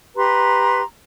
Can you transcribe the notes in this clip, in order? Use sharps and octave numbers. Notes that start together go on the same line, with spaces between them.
G4 B4 A#5 C6